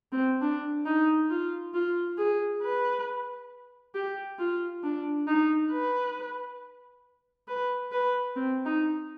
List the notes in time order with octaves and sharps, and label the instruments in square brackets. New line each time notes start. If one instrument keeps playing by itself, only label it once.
[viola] C4
D4
D#4
F4
F4
G#4
B4
G4
F4
D4
D#4
B4
B4
B4
C4
D#4